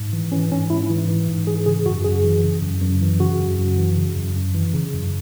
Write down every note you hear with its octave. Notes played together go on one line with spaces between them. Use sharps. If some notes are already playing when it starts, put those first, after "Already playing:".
Already playing: G#2
E3
E3 C#4
G#2 C#4
G#2 E4
E3
E3
G#2
E3 G#4
C#3 G#4
F#2 F#4
F#2 G#4
E3
C#3
F#2
F#2
E3
C#3 F#4
F#2
F#2
E3
C#3
F#2
F#2
E3
C#3
F#2